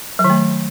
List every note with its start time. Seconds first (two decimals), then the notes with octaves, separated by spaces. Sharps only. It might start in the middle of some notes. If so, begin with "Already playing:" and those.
0.19 F#3
0.24 D#3
0.30 A3